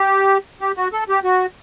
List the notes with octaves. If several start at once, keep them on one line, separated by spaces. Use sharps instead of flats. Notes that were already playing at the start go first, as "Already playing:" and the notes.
Already playing: G4
G4
F#4
A4
G4
F#4